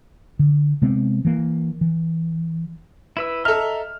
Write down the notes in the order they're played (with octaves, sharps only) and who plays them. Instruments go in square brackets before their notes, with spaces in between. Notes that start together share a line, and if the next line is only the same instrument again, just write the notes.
[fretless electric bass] D3
C3 G#3 B3 C4
E3 A#3
E3
[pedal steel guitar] E4 B4 E6
[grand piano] A4 F6 [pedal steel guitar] D#5 E5 A#5